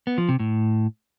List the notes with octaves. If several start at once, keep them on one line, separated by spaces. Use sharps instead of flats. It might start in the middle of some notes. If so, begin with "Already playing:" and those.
B3
F3
C3
A2